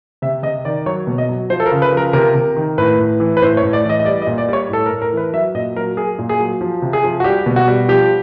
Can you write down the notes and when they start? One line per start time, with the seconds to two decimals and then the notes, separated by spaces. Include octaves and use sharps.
0.22 C3 E5
0.43 C3 D#5
0.65 D#3 D5
0.86 F#3 C#5
1.07 B2
1.18 D#5
1.29 F#3
1.50 F3 C5
1.60 A4
1.66 A#4
1.72 C#3
1.82 B4
1.92 F3 A#4
2.13 C3 A#4
2.35 C3
2.56 D#3
2.78 A2 B4
2.99 A2
3.20 E3
3.37 B4
3.42 A2 C5
3.57 C#5
3.63 A2
3.73 D5
3.84 E3
3.89 D#5
3.99 D#5
4.05 G3 D5
4.22 D#5
4.27 A#2
4.38 D5
4.49 G3 C#5
4.69 A2 A4
4.86 A#4
4.91 A2
5.02 A#4
5.12 E3 B4
5.33 F#3 E5
5.55 A#2 D#5
5.76 F#3 A#4
5.97 F#3 G#4
6.19 A#2
6.29 G#4
6.40 F#3
6.61 F3
6.82 C3
6.93 G#4
7.04 F3
7.20 F#4
7.24 G3 G4
7.46 B2
7.56 F#4
7.68 G3
7.88 F3 G4